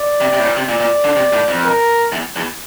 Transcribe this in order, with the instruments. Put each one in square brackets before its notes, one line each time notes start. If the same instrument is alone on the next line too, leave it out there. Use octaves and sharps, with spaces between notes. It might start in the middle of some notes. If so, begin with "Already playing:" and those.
Already playing: [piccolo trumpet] D5
[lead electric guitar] C3
C3
A2
A#2
C3
[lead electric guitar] A#2 [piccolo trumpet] D5
[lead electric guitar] A#2
D3
C3
A2
F2
[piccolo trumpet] A#4
[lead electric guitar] E2
E2